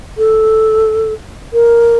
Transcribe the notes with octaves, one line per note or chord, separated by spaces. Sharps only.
A4
A#4